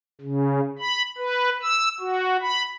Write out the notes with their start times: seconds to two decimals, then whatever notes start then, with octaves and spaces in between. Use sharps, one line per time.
0.21 C#3
0.79 B5
1.18 B4
1.63 E6
2.00 F#4
2.41 B5